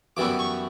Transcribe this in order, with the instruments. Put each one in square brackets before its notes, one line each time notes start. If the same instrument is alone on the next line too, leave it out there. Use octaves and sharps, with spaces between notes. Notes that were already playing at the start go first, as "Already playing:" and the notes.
[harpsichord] F#2 E3 G3 B3 E4 D6
C#6